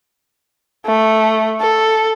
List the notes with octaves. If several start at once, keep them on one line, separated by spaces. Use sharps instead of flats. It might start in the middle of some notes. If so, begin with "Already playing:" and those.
A3
A4